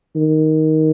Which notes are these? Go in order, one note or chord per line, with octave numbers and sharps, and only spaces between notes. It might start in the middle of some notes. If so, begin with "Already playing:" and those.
D#3